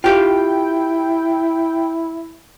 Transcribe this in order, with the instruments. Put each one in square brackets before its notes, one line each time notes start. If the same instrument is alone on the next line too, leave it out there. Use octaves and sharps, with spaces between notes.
[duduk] E4 [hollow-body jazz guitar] F4 G4 F5 [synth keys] G5